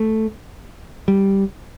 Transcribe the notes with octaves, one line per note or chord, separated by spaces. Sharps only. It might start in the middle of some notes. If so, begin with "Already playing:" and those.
Already playing: A3
G3